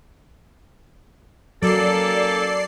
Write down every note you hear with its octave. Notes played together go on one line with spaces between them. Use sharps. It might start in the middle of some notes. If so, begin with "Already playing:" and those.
F#3 A#3 C#4 A4 D5 C7